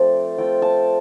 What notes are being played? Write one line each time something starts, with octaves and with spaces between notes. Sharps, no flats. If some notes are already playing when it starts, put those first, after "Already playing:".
Already playing: F3 A3 C4 C5 D5
A3 C4 F4 G5
A5